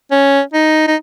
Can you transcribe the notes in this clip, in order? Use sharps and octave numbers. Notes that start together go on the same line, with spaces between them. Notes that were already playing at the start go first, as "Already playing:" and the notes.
C#4
D#4
D#4